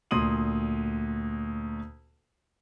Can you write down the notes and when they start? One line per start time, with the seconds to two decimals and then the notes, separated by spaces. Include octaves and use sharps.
0.11 D2 A#2 C6 D#6 D#7 F#7